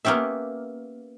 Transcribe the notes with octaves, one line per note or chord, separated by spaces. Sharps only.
A#3 B3 C#4 G4 E5